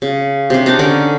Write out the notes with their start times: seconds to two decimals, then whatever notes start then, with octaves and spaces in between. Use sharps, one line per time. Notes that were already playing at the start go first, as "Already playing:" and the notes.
0.02 C#3
0.50 C3 D4
0.66 D4 D#4 C#5 D6
0.79 D3 C#4 D#4 A#4